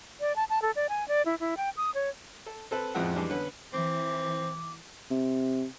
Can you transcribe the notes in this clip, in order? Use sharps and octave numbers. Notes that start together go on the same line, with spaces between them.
D5
A5
A5
A4
D5
G#5
D5
E4
E4
G5
D#6
C#5
A4
C4 A4 B4
A1 F2 F3 G#3 E5 F#5
E3 G3 G#3 D4
D3 B3 C#4 B4
E3 C4 D6
C3